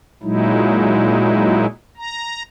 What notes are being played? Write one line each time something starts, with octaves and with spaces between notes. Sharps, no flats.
A#2 F#3 G#3 D#4 E4
A#5